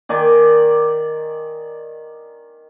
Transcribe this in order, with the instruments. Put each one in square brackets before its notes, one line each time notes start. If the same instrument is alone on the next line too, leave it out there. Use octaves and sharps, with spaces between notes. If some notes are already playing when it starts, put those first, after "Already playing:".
[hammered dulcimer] D#3 D5 G#5 D6